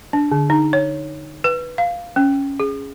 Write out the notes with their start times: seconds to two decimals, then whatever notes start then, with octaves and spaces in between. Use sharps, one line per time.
0.13 D4
0.31 D3
0.50 D#4
0.73 C#5
1.44 B4
1.78 F5
2.16 C#4
2.60 G#4